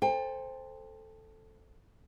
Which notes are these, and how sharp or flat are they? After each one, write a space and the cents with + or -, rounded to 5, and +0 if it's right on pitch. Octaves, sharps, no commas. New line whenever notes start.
A4 +0 C5 +0 G5 +35